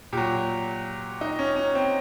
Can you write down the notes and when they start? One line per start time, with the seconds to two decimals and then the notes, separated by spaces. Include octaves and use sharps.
0.13 A#2 F#3 G4
1.21 D#4
1.39 C#4
1.56 C#4
1.75 C4